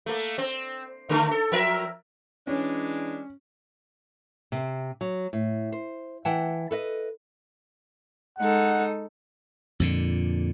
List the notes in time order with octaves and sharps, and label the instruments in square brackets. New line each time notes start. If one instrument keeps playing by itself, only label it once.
[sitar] A3 A#3
C4
D3 A3 A#4
A4
F3 A#4 E5
[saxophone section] E3 G#3 D4 [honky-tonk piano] C#4
[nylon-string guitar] C3 C4
F#3
A2
C5
E3 F#5 G5 A5
A4 B4 D#5
[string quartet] G#3 D#4 A4 [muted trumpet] F#5
[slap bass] F2 A#2 D3